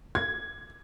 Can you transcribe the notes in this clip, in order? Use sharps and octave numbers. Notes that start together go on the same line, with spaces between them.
G#6